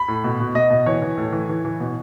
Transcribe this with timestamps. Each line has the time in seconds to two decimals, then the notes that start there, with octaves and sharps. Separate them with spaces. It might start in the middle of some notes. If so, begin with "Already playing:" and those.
Already playing: B5
0.08 A2
0.24 B2
0.40 B2
0.55 B2 D#5
0.70 B2
0.86 E3 C#5
1.02 E3
1.17 A2
1.33 E3
1.49 E3
1.65 E3
1.80 B2